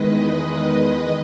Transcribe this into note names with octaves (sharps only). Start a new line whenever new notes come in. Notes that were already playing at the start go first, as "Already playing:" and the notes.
Already playing: E2 D#3 G#3 B4 D#5